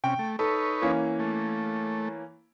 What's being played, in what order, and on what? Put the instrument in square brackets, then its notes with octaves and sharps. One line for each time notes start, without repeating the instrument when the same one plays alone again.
[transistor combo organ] C3 C#4 [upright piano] G5
[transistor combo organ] A3
[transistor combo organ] D#4 B4 C#5 [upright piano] A4
[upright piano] E3 A#3 C#4
[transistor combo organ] A3